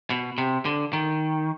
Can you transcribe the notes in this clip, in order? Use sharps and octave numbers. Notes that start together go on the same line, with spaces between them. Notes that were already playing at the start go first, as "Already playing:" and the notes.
B2
C3
D3
D#3